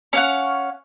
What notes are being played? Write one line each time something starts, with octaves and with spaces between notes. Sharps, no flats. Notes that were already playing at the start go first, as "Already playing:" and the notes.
C#4 F5 F#5